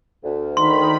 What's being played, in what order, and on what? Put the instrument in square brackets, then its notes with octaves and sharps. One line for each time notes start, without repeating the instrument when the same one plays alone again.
[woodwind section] D2
[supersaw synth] D#3 B5 [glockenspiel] C6